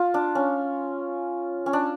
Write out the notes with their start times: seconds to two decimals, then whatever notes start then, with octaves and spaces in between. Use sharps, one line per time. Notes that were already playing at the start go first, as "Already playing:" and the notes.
Already playing: F4
0.14 D4
0.35 C#4
1.66 C#4
1.73 D4